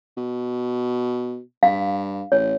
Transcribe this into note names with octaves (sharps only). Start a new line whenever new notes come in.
B2
G2 F5
A1 C#5